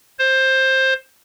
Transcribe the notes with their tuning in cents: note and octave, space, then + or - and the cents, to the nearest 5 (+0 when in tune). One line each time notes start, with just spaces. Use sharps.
C5 +15